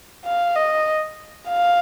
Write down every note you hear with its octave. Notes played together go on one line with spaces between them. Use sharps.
F5
D#5
F5